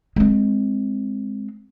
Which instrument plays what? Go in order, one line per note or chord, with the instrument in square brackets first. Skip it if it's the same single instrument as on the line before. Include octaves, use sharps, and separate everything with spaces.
[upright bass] G#3 C4